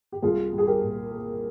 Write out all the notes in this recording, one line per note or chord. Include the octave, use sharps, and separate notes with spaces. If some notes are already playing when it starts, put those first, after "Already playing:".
G4
C2 F4 G#4
G3
G#4
G4 A#4
A#2
A#3